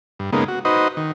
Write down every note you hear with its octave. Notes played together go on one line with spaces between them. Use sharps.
G2
C#3 G#3 A#3 B3 D#4
F#4
D#4 F#4 B4 C5 D#5
D#3